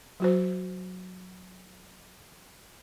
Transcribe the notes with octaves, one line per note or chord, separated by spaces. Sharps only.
F#3 F#4 C5